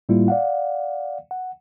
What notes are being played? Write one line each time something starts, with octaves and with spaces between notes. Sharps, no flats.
A2 G3 A#3 E4 F4
D5 F5 F#5
F#5